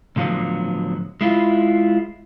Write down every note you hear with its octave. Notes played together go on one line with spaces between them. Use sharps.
A2 D3 F3 F#3 B3
G#3 E4 F4